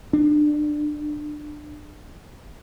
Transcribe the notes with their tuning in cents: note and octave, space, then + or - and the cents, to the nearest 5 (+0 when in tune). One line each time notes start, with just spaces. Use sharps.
D4 +25